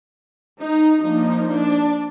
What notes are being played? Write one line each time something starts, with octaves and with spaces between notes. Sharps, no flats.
D#4
F3 A#3 D4 D#4
D4